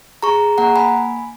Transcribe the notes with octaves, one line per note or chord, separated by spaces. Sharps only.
G#4 A#5 C#6
A#3 F#5 A#5
G#5 B5